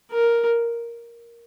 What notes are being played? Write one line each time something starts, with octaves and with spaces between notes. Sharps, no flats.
A#4